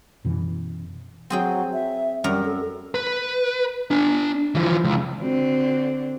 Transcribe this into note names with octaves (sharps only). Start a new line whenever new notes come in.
F#2 B2 E3
F#3 C4 G#4 G5
E5
F#2 G3 A#4 A#5
A4
B4
D4 G#5
E3 F3
C#2
D3 C4 F#4